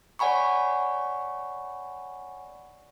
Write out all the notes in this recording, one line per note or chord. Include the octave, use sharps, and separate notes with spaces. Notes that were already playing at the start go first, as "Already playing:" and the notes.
C#5 D5 F#5 G#5 B5 C#6